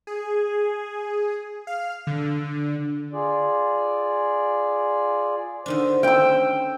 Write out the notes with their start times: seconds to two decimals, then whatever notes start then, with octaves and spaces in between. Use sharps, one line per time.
0.07 G#4
1.67 F5
2.07 D3
3.13 F4 G#4 D5
5.66 D3 D#3 D4 C5
6.03 A3 C#4 G5 E6